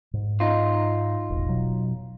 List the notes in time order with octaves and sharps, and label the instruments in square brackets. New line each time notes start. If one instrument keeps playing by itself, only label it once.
[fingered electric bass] G#2
[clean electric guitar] D#4 F4
[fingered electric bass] E1 A1
B2 F#3